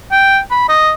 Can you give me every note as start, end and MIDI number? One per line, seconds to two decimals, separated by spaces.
0.12 0.40 79
0.51 0.69 83
0.69 0.92 75